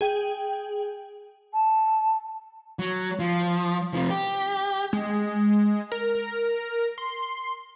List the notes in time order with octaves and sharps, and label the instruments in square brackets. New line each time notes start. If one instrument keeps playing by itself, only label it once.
[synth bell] G#4 G5
[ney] A5
[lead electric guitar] F#3
F3
C3 F3
G4
[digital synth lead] G#3
A#4
A#4
C6